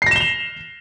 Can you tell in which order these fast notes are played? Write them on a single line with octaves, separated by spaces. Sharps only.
C7 A#6 E7 G7 F7